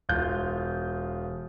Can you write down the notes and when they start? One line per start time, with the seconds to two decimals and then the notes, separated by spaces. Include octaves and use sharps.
0.09 E1 F4 G6